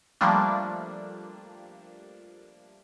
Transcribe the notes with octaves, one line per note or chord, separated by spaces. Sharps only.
F3 G3 A3 A#3 D4